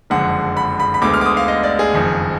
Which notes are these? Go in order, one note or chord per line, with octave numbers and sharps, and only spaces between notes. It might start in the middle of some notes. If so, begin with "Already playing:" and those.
F#1 F2 D3 G#3 F#5
B5
B5
B5
D2 D3 G#3 B3 D6
F6
D6
D#6
F5
D#5
D5
G#4
F#1 F2 D#3